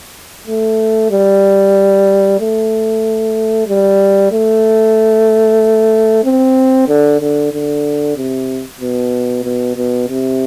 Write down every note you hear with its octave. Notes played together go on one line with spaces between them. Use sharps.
A3
G3
A3
G3
A3
C4
D3
D3
D3
C3
B2
B2
B2
C3